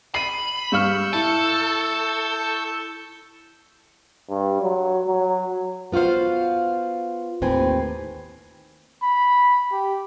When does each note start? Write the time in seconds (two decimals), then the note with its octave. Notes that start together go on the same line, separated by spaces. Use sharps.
0.15 B5 C7 D#7
0.72 G2 F5 C#6 E6 F6 G6
1.13 E4 A4
4.29 G2
4.62 F#3
5.07 F#3
5.92 B3 F4 F#4 C5 F5
7.42 D#2 A2 C4 B4 G#5
9.03 B5
9.72 G4